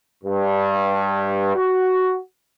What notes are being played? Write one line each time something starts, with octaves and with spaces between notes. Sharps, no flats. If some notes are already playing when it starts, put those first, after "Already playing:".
G2
F#4